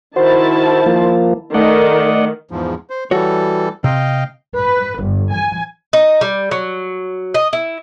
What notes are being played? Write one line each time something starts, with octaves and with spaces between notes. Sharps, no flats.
D#3 E4 F#4 C5 A5
F3 A#3
D#3 A3 D5 D#5 F#5
E2 G#2 F3
C5
E3 G3 F#4 A4 C#5
C3 D#5 F5 G5
B4
G1
G#5
D#4
G3
F#3
D#5
E4